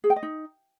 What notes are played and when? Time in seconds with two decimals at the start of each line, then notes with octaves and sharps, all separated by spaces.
0.04 G#4
0.10 G5
0.16 D#5
0.23 D#4